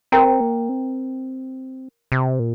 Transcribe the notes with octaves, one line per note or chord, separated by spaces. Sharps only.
C4 A#4 G5 A#5
A#3
C4
C3
A#2